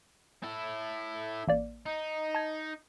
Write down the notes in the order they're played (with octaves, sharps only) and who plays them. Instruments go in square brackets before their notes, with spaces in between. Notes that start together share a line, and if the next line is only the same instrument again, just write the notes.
[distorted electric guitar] E4 A4
[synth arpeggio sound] A1 A#3 D5
[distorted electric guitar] D#4
[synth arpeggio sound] A5 G#6